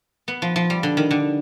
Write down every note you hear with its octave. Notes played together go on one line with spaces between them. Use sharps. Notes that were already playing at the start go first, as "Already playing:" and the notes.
B3
F3
F3
G3
D3
D#3
D3